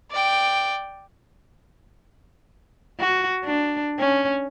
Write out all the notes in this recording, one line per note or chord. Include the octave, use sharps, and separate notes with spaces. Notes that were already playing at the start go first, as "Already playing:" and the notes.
D5 G5
F#4
D4
C#4